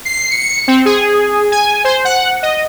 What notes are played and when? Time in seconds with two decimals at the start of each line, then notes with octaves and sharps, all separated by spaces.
0.05 C7
0.31 C#7
0.68 C4
0.85 G#4
1.52 G#5
1.84 C5
2.05 F#5
2.43 D#5